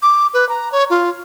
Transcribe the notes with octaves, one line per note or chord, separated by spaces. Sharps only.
D6
B4
A#5
C#5
F4